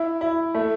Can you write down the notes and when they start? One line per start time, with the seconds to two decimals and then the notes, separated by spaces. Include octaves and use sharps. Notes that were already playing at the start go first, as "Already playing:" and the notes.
Already playing: E4
0.21 E4
0.54 A3